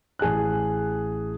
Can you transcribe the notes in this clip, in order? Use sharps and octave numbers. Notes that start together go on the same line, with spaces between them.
A1 G#4 A5 F#6